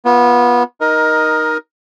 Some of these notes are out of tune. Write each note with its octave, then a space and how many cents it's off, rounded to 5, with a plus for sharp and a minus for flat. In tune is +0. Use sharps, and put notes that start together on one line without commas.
B3 -20 F4 +0
D#4 +0 A#4 +15 D#5 +0